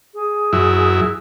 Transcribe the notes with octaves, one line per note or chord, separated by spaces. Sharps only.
G#4
F#2 E4